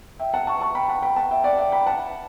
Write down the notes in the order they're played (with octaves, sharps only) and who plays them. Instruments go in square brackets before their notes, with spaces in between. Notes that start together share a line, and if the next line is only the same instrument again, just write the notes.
[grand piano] E5 G5
F#5 A5
A5 C#6
A5 C#6
G5 B5
F#5 A5
G5 B5
F#5 A5
E5 G5
D5 F#5
E5 G5
G5 B5
F#5 A5